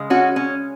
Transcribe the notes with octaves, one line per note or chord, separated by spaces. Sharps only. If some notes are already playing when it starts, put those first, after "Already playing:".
Already playing: C#3 G#3
C#4 F#4
C#4